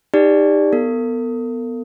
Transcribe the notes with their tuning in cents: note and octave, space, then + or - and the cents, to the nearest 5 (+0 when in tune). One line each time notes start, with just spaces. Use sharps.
D#4 +0 G4 +30 D5 +0
B3 +0 A4 +45